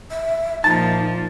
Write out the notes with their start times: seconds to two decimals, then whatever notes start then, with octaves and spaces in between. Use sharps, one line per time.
0.11 E5
0.64 A#2 F3 D#4 A5 A6